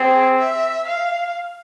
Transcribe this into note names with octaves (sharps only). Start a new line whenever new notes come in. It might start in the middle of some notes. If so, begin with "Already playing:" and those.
Already playing: C4 G#4
E5
F5